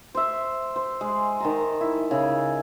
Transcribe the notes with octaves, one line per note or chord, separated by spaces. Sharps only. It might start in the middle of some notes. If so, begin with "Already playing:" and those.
C5 E5
C5
G#3
D#3 A5 A#5
E4
C#3 E4